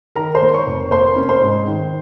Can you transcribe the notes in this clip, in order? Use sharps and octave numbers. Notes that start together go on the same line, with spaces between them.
D#3 A#4 A#5
C5 C6
A#3
C#5 C#6
F1
A#3 C5 C6
C#4
C5 C6
G#2
D#3